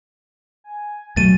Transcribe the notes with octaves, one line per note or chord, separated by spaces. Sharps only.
G#5
D#2 B2 F#3 A3 A6 D#7